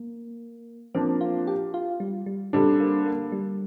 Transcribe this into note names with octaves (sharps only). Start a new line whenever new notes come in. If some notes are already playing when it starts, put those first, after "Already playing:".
Already playing: A#3
F3 A#3 C4 D4
F4
G4
F4
G3
G3
D3 G3 C4 D4
A#3
A#3
G3